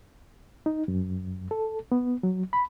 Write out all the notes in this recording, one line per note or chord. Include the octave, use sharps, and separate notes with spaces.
D#4
F#2
A4
B3
F#3
B5